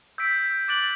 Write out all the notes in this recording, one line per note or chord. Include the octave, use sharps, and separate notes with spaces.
E6 G6 B6 D7
D6 F#6 A6 D7 F#7